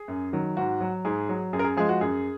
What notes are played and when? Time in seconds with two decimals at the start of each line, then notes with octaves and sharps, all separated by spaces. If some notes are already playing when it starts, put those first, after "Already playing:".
Already playing: G#4
0.08 F#2
0.33 D#3 F#3
0.57 G#2 F#4
0.81 F#3
1.05 G#2 G#4
1.29 F#3
1.53 F#2 G#4
1.59 A#4
1.64 G#4
1.77 F3 G#3 G#4
1.89 F#4
2.01 F#2 G#4